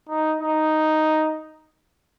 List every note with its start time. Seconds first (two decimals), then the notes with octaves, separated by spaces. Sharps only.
0.10 D#4
0.42 D#4